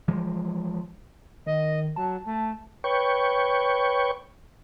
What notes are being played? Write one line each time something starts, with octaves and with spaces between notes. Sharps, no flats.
E3 F3 G#3
D#3 D#5
F#3 A5
A3
B4 C#5 G5 C#6